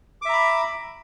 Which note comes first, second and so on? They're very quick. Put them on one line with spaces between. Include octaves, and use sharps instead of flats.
D6 E5 A#5 B5